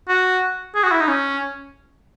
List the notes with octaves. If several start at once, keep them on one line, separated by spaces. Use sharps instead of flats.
F#4
G#4
F#4
E4
D#4
C#4